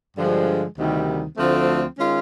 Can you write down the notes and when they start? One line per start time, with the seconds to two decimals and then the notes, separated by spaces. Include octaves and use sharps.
0.16 G2 D3 F3 G#3
0.76 D2 C3 D#3 G3
1.36 D2 D3 F3 A3 C4
1.97 D#3 G#3 C#4 F4